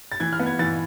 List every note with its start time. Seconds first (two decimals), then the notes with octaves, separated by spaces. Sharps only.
0.12 A6
0.20 E3 G#6
0.33 F6
0.40 B3
0.46 G#6
0.59 E3 A6